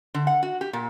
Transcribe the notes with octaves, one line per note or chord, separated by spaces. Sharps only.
D3
F#5
F#4
G4
A#2